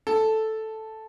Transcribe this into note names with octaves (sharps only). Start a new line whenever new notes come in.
A4